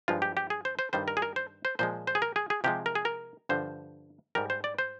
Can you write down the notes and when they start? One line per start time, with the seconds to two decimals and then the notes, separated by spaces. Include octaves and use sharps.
0.08 G2 F3 G#3 F4
0.22 G4
0.37 G4
0.50 G#4
0.65 C5
0.79 C5
0.93 G2 D#3 G3 C5
1.08 A#4
1.17 G#4
1.22 A#4
1.36 C5
1.65 C5
1.79 A#2 F3 G#3 C5
2.07 C5
2.15 G#4
2.22 A#4
2.36 G#4
2.50 G#4
2.64 C3 F3 G#3 G4
2.86 A#4
2.95 G#4
3.05 A#4
3.49 G2 D3 F3 C5
4.35 G#2 G3 A#4
4.50 C5
4.64 D5
4.78 C5